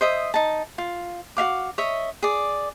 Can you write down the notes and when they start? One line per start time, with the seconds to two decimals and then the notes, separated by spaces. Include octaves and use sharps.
0.01 C5 D#5 E5 D#6
0.34 D#4 A5
0.78 F4
1.37 F#4 E5 F5 D6
1.78 C#5 D#5 E5
2.22 G#4 D5